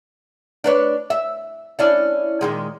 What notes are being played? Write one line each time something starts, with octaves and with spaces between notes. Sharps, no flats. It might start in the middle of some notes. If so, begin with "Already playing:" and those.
D4 B4 C#5
E5
C#4 D4 E4
A#2 D#3 G#3